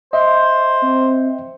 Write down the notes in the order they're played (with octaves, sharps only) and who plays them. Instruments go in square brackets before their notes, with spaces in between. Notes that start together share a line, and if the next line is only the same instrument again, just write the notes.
[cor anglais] C5 [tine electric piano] D#5 E5
[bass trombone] C4